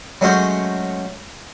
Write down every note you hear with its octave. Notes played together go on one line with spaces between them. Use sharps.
F#3 G#3 A3 C#4 F#4 C5